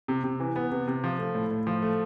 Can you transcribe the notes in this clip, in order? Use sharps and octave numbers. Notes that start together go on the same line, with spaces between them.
C3
C3
E3
B3
C3
C3
F3
A3
A2
A2
F3
A3